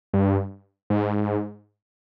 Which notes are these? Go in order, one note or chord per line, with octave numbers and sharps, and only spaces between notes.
G2
G#2